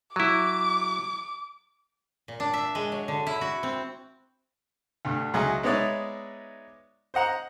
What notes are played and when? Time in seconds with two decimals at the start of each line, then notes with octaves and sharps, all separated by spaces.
0.16 F#3 E4 D6
2.28 A#2
2.40 D4
2.54 E5
2.75 G#3
2.92 F#3
3.08 D3
3.27 E4
3.41 F#4
3.63 C4
5.05 D2 G2
5.34 C#2 F#3 G#4 D#5 E5 G#5
5.63 G#3 B3 D#4 C#5 D5 E5
7.14 C5 D#5 F#5 A#5